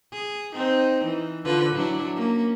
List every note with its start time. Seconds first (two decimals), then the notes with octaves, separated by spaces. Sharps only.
0.13 G#4
0.54 C4 D#4
1.05 E3
1.45 D3 F4 B4
1.75 F#3 D4 E4
2.15 A#3 C#4